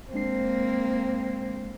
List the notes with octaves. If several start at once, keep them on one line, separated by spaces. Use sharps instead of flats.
G#3 A#3 C4 D4 C7